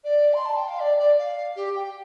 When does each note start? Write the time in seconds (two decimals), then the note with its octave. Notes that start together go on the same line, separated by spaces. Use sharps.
0.04 D5
0.33 C6
0.45 A5
0.56 G5
0.68 F5
0.80 D5
0.98 D5
1.18 F5
1.55 G4
1.75 G5